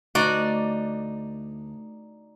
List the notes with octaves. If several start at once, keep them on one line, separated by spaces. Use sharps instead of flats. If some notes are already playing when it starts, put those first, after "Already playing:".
D2 D#4 F#4 D5